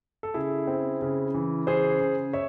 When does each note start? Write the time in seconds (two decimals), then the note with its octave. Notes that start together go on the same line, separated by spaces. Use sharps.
0.23 A4
0.34 C#3 E4 G#4
0.67 C4
1.02 C#3
1.34 E3
1.67 C#3 G#4 C5
2.01 C#3
2.33 C#5 E5